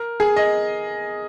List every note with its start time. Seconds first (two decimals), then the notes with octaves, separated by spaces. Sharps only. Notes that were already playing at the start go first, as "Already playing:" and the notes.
Already playing: A#4
0.20 G#4
0.36 D#5